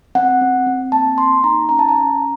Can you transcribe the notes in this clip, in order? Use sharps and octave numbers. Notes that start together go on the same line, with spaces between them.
C4 F#5
C4
C4
A#3 A5
A#3 C6
D#4 A#5
C#4 A#5
A5
A#5
C#4